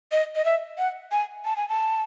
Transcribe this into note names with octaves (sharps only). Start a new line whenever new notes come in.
D#5
D#5
E5
F#5
G#5
A5
G#5
A5